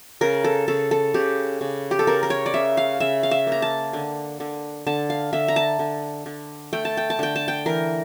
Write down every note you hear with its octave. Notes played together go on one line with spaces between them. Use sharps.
C#3 A#4
A4
C#3 A4
A4
C#3 G4
C#3
G4
A4
C#3 A#4
A#4
C#5
D5
C#3 E5
F5
C#3 E5
F5
E5
A#3
A#5
A5
D3
D3
D3 A5
F5
D3 E5
A#5
A5
D3
D3
A3 G5
A5
G5
A5
D3 G5
A5
G5
E3 A#4